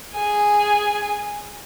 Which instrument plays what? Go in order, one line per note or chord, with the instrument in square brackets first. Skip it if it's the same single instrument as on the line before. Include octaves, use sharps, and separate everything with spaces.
[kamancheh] G#4 G#5